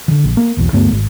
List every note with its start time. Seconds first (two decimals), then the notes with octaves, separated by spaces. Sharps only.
0.08 D3 D#3
0.24 A#1
0.37 A#3
0.57 E1 B1 E2
0.73 D2 G2 A3 B3
0.92 G#1